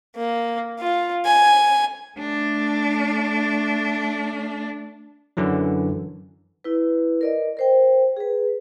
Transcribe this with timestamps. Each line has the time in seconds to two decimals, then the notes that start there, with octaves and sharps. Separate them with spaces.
0.16 A#3
0.79 F4
1.25 G#5
2.18 A3 D4
5.37 F#2 D3 E3 F#3
6.64 E4 B4
7.21 A#4 D5 D#5
7.57 A#4 C5 G5
8.17 G#4 B4